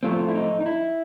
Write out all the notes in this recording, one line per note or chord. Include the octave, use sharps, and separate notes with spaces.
A2 F3 A3 C4 F4
E4
D#4
D#4
E4